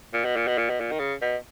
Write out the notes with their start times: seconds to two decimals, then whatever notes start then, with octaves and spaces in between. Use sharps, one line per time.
0.13 A#2
0.24 B2
0.36 A#2
0.47 B2
0.58 A#2
0.69 B2
0.80 A#2
0.91 D#3
0.99 C#3
1.22 B2